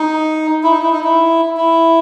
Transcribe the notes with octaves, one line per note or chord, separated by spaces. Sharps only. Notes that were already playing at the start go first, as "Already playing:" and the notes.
Already playing: D#4
E4
D#4
E4
D#4
E4
E4